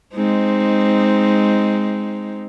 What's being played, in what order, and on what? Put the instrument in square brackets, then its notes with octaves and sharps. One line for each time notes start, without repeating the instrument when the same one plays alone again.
[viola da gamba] G#3 C4 D#4